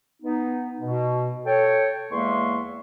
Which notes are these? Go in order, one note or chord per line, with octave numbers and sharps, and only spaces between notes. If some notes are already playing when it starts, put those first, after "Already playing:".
B3 D#4
B2
A4 C#5 G5
E2 G#3 A#3 E5 C6 C#6